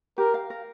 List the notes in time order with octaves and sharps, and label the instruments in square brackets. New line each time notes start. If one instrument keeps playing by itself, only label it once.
[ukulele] G4 [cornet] A#4
[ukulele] F5
A#4